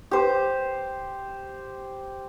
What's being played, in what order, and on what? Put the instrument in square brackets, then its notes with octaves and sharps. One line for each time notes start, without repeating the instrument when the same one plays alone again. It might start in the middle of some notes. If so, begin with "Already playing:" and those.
[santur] G4 C5